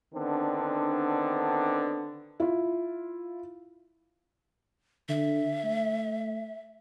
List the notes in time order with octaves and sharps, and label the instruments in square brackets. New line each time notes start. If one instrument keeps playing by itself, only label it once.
[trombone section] D3 D#3 B3 C4 D4
[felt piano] E4 F4
[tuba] D3 [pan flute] E5
[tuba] A3